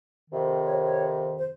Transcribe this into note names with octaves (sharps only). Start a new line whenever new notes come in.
F2 C3 D#3
C#5
C#5
C5